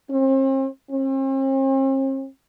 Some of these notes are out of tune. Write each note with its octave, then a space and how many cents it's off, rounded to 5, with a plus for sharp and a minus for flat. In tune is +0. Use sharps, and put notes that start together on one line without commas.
C4 +40
C4 +45